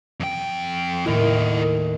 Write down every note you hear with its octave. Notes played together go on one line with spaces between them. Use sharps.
F2 G5
D#2 A2 E4 A#4